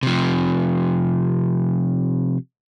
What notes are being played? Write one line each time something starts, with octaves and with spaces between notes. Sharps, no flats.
C3 F3